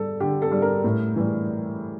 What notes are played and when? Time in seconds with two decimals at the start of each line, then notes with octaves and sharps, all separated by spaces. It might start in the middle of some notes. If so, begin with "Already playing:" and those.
Already playing: G3 A4
0.20 D3 G4
0.42 A4
0.52 G3
0.62 A#4
0.84 A2
1.16 E3 G3